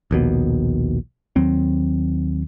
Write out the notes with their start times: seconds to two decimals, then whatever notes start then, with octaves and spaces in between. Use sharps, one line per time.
0.11 A#1 D#2 B2
1.36 D#2 F#3 C4